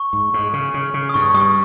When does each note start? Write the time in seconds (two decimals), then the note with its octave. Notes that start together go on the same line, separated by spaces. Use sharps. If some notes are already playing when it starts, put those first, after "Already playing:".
Already playing: C#6
0.13 G#2
0.34 G#2
0.53 C#3
0.74 C#3
0.94 C#3
1.09 D#6
1.14 G2 C#6
1.34 G3 D#6